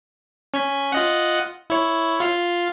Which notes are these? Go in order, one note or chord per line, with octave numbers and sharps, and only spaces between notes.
C#4 G#6 B6
F4 D#5 F#5
E4 C#5
F4 F5